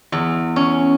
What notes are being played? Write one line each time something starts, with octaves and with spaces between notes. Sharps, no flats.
E2
C#4